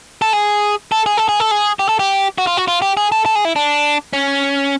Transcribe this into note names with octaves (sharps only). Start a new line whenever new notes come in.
A4
G#4
A4
G#4
A4
G#4
A4
G#4
G4
A4
G4
F#4
F4
F#4
F4
G4
G#4
A4
A4
G#4
E4
D4
C#4